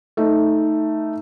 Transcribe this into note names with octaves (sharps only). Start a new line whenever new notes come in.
A3 D#4